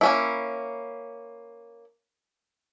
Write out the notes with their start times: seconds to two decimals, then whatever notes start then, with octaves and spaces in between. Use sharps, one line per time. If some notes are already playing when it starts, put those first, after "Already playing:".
0.01 A#3 C#4 E4